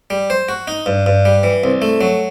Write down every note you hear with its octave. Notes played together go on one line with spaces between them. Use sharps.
G3
C5
F#4
D#4
G2
G2
G3
E3
C2
A3
F#3